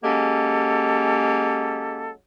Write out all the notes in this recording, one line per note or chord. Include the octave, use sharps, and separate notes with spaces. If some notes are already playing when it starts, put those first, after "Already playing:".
F#3 G#3 A#3 C#4 G4 A4